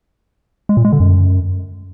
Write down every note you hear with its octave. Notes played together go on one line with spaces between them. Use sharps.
G#3
A#2
G#3
D3
F#2